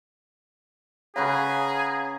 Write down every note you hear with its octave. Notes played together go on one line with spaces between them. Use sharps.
C#3 G#4 B4 C#5 F5 F#5 A#5